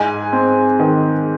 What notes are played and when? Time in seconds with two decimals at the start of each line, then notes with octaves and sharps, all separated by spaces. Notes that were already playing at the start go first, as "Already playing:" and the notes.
Already playing: G#2 G#5
0.33 C4
0.79 D#3